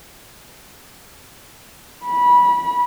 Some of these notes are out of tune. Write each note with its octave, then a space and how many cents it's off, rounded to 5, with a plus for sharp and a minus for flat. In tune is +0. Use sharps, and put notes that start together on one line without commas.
B5 -20